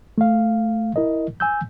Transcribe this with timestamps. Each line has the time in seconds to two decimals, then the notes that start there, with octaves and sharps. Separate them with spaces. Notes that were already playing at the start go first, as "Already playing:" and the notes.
0.18 A3 F5
0.96 E4 A#4 D#5
1.40 G#5 E6 G6